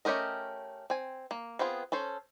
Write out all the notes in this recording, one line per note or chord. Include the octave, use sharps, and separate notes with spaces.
A3 C#4 G4 A#4 D#5
C4 G#5
A#3
B3 C4 F4 G#4
C#4 A4 C5